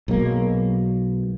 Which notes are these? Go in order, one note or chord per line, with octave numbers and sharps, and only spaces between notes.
B1 F#3 G#3 A#3